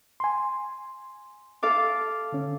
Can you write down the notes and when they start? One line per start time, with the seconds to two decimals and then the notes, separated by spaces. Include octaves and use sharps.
0.20 G#5 C6
1.63 A4 F5 D6
2.32 D3 C#4